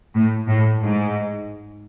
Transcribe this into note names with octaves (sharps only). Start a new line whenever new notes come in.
A2
A2
G#2